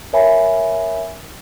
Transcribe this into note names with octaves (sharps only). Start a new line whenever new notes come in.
A#4 C#5 E5 G#5 B5